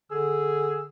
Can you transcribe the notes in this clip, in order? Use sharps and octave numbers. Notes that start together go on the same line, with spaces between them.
D3 G#4 E6